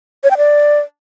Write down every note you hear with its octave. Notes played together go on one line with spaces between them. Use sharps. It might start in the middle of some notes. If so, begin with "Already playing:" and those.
C#5
G5
D5